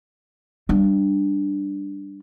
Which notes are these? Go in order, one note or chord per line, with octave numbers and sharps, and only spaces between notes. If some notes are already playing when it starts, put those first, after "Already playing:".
G3 D4